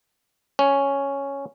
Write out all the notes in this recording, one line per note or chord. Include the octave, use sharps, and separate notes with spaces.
C#4